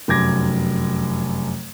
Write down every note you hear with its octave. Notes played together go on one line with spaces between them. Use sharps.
F1 F#2 D6 G#6 A#6